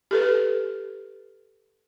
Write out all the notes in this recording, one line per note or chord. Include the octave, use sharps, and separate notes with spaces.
G4 A4 B4